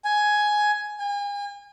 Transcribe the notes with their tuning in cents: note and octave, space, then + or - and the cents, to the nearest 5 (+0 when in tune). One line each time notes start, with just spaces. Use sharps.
G#5 +10
G#5 -40